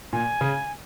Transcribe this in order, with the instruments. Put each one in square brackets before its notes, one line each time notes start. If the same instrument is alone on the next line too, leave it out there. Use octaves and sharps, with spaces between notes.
[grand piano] A#2 [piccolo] G#5
[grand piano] C#3